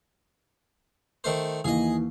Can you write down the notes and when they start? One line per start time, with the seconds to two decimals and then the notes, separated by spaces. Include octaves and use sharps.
1.24 D#3 A3 C5
1.64 D#2 E3 G#4 D#5